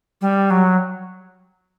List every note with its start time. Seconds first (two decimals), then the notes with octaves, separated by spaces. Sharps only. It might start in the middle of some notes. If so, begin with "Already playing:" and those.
0.21 G3
0.50 F#3